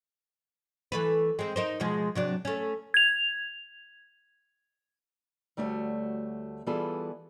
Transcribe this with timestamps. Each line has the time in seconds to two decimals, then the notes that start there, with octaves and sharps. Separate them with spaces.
0.92 E3 A3 B4
1.39 G#3 C4
1.56 D#4 A#4 C5
1.80 B2 F3 G#3
2.15 C3 F#3 D4
2.45 A3 C#4
2.94 G#6 F7
5.57 D2 G3 A3 F#4 C#5
6.66 E3 G3 B3 F4 G#4 A4